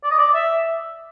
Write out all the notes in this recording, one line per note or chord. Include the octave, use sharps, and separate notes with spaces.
D5
D#5
D5
E5